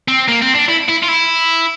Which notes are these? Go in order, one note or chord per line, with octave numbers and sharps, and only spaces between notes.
C4
A#3
C4
D4
E4
E4
F4
E4